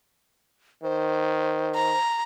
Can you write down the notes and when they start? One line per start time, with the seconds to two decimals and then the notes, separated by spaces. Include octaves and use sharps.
0.83 D#3 C5
1.75 A#5